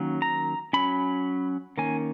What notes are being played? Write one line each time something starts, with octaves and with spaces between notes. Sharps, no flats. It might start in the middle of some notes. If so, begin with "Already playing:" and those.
Already playing: D#3 F#3 A#3 C#4
A#5
F#3 C#4 B5
D#3 A#3 C#4 G#5